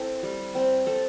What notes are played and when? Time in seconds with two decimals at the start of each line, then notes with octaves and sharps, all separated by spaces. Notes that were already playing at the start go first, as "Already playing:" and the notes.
Already playing: C4 E4 A4
0.23 G3
0.55 C4
0.86 C4 A4